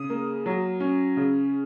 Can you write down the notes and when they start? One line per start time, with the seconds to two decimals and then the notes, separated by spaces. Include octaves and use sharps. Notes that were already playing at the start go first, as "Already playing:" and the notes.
Already playing: C#3 D#6
0.10 A#3
0.46 F#3
0.80 C#4
1.17 C#3